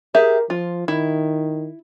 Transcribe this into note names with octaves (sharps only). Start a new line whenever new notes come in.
G4 G#4 A#4 E5
F3 F4
D#3 E4